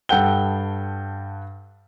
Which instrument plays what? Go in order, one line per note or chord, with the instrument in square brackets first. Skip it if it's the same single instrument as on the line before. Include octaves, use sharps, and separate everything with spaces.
[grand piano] G2 A4 F#5 G5 G7